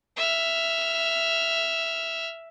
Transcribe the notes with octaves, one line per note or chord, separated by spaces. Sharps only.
E5 F6